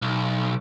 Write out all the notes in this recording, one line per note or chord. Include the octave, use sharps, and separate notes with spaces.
B1